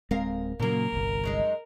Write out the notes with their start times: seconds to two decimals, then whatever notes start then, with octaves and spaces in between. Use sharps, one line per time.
0.11 D1 G#3 C4 A#4 F5
0.59 F#2 A#2 C#3 F#3 A#3 A#4
0.92 G1 C2
1.24 F#2 G#3 D#4